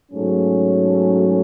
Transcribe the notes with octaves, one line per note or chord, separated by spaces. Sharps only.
G#2 F#3 A3 C#4